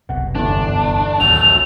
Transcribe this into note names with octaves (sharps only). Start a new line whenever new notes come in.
F#1 C2 B2 F#5
G1 E2 D4
A#1 D#2 F#3 A3 F7